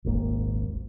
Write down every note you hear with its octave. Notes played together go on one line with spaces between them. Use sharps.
D#1 G#1 A#3